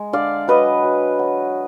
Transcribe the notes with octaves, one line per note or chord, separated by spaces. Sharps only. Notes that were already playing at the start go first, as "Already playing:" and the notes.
Already playing: G#3
D3 D5 F5
F#3 B4 D#5
F#3
F#3